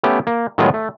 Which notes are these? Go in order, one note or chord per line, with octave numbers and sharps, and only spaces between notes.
A3 B3 C#4 G4
A#3
A2 D#3 F#3 G#3 B3 F4
A3